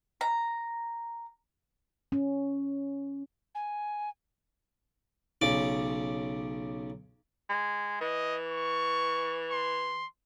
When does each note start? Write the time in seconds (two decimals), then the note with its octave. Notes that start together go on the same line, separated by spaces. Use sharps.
0.21 A#5
2.12 C#4
3.55 G#5
5.42 B1 C#3 D5 D6
7.49 G#3
8.01 E3 D#5
8.48 C#6
9.51 C6